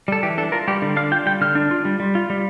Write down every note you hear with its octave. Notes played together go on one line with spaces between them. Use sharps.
G3 A4
E3 G4
D4 A4
F4 A#4
G3 G4
D3
D4 F5
F4 G5
G3 G5
D3 F6
D4
F4
G3
G3
F4
G3